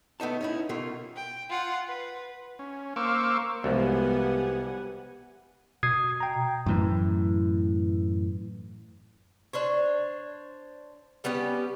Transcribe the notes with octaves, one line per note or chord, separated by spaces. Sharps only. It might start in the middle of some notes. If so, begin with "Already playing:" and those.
G2 A3 B3 D#4 A5
C#4 D#4 E4
B2 A3 F4 A#4
G5
F4 F#5
B4
C#4
A#3 C5 F5 C#6 D6 E6
C2 G#2 B2 F3 B3 G4 F#5 G#5
B2 D#6 G#6 C7
G5 A#5
F#2 A2 E3
D4 C5 C#5
G3 B3 C#4 G4